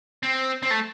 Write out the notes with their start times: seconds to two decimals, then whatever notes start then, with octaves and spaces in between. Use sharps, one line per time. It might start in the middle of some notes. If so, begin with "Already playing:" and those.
0.23 C4
0.63 C4
0.71 A3